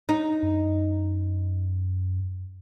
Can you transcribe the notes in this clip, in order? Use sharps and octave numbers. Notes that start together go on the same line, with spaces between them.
D#4
F#2